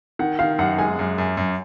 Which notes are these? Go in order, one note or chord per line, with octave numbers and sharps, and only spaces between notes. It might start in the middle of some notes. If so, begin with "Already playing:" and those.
D#3 F#5
D#3 F5
F#2 F#5
G#3 G#5
F#2
F#2
F#2